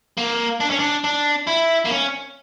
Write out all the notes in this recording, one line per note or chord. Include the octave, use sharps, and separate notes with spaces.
A#3
D4
C#4
D4
D4
E4
A#3
C#4